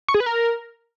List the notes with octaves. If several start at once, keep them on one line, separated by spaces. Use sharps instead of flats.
C#6
G#4
B4
A#4